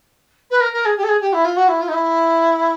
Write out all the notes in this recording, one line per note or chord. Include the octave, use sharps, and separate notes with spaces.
B4
A#4
A#4
G#4
G4
A4
G#4
G4
E4
F4
F#4
E4
F4
D#4
E4